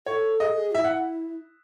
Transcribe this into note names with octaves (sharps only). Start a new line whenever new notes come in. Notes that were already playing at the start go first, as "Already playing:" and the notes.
A4 C#5
G#4 D#5
A4
G#4
E4 E5
F#5